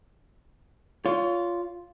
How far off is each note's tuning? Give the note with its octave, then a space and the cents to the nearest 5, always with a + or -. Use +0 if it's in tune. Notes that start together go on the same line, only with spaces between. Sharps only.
F4 +0 C#5 +30